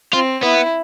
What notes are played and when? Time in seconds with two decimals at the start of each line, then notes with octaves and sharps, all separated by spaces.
0.13 C4 F4
0.43 B3 E4